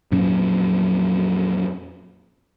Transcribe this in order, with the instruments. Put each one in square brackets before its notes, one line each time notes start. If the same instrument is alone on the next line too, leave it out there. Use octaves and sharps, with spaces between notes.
[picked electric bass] F2 A#2 F#3 C#4